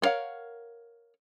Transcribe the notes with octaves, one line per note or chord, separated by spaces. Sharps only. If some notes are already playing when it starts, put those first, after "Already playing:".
B3 A#4 C#5 F5 F#5